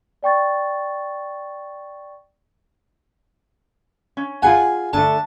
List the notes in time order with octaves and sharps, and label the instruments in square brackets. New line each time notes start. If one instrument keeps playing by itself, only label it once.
[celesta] D5 G5 C#6 A6
[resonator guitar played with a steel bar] C#4
[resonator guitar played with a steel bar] F4 G#4 F#5 [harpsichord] G#5
[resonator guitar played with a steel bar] D3 A3 [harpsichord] A5